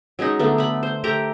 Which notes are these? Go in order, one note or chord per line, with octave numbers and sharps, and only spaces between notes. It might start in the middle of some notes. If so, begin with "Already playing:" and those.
F#3 G#3 C#4 D#4
D3 A3 B3
A3 B5
C5
A3 G4 A#4 A#5